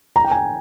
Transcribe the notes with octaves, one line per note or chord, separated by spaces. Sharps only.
A#5
G5
G#5